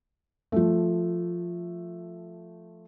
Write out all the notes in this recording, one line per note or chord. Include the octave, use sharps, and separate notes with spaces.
F3 A3